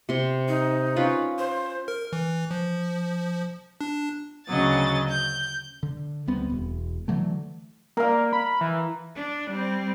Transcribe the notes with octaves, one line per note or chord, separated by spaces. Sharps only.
C3 C6
D#4
C#4 F4 B4
C5
A#4
E3
F3
D4
D2 C#3 F#3 D#5 A6
G6
D3
D2 G3 B3 C4
E1
D3 E3 F#3 A3
A#3 A#4 F5
B5
E3
D4
G3 C4